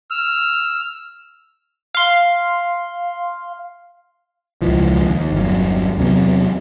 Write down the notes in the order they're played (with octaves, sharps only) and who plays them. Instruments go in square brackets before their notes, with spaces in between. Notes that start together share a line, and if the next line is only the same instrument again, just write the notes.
[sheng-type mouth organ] E6 F6
[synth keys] F5 C6
[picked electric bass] E1 C#2 E3 F3
D#2
G1 E2 F#3
E2 C3 F#3 B3